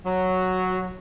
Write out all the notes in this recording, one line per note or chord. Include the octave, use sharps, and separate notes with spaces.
F#3